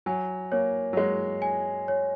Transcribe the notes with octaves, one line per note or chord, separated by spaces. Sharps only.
F#3 G#5
A#3 C#5
F#3
G#3 C#5
G#5
C#5